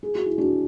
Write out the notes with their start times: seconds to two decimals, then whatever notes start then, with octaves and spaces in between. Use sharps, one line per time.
0.03 G#4
0.15 F#4
0.26 E4
0.38 D4 F#4